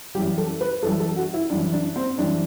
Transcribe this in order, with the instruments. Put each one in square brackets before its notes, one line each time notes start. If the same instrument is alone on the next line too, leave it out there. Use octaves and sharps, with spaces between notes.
[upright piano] F#2 E3 G3 G4
A4
B4
F#2 E3 G3 A4
A4
F#4
E4
F#2 E3 G3 D4
D4
C4
F#2 E3 G3 D4